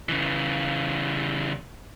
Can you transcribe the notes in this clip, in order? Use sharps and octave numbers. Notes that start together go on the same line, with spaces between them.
C#3 E3